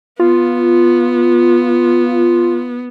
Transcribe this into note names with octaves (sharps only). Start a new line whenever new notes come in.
B3 F4